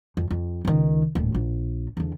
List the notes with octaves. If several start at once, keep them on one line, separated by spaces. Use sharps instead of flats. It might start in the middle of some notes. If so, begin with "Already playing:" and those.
F2
F2
C#2 D#3
D#1 A2
A#1
E2 D3